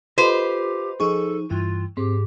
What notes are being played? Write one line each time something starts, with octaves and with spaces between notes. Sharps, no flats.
F4 G4 A4 B4 C5 D#5
F3 D#4 G#4 A4 C#6
G2 E3 E4 F4
G#2 C4 G4